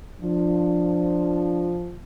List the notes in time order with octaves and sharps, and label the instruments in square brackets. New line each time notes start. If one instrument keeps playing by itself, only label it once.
[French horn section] F3 [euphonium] D4